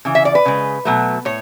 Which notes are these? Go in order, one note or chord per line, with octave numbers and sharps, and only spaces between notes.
C#3 E3
E5
D5
B4
C#3 G#3
B2 F#3 A3
A2 C#5